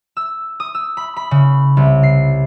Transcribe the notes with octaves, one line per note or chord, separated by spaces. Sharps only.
E6
D#6
E6
B5
B5
C#3
C2
C7